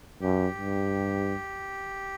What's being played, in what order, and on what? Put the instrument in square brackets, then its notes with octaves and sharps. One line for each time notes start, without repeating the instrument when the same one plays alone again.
[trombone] F#2 [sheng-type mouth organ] G4
[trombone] G2